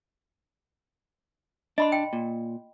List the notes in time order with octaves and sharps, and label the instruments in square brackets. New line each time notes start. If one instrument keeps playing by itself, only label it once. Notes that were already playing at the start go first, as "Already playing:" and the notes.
[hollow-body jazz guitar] D4 [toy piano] D#5 B5 C6
[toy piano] G5
[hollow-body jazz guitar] A#2